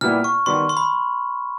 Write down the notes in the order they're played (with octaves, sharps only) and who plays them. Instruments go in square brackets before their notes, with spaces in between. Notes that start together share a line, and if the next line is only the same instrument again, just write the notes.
[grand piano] A#2 G3 B3 E4 G4 [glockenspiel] F6
[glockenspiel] C#6
[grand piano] D#3 G3 B3 [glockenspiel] C6
[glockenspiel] C6
B5